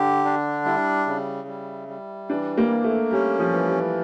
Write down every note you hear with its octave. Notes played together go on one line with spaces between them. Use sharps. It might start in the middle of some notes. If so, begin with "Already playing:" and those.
Already playing: D3 G4
D4
G3 E4
C#3
G3
G3
E3 D4
A#3
A#3
A3
G3 C#4
F3
E3
G3